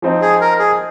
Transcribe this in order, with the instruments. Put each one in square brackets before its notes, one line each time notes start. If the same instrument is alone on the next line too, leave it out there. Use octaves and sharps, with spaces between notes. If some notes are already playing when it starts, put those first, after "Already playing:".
[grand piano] F3 C4 D#4
[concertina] G#4
A#4
G#4